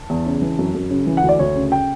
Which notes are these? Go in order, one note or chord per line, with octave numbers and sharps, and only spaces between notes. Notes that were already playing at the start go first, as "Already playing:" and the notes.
Already playing: A5
E2
C#3
E3
F#2
F#2
C#3
E3
F#5
D2
D5
D2 C#5
C#3
G5